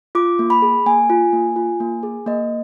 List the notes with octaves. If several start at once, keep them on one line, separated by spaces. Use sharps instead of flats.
F4 D6
A#3
B5
G#4
A#3 G#5
F4
A#3
F4
A#3
G#4
A#3 D#5